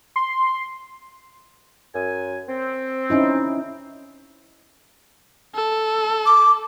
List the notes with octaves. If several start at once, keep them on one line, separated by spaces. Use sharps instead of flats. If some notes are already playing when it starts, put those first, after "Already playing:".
C6
F#2 G#5
C4
C#4 D#4 E4
A4
D6